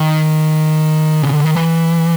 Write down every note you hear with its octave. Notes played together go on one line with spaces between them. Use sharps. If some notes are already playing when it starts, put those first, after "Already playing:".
Already playing: D#3
C#3
D3
D#3
E3